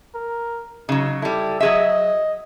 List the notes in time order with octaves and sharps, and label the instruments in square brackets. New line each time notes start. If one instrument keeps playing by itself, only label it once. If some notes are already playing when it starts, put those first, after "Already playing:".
[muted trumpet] A#4
[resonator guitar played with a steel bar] C#3 F#3 [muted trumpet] D#4
[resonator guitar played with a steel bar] G3 E4 [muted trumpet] A4
[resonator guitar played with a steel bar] F#3 G#4 E5 [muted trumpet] D#5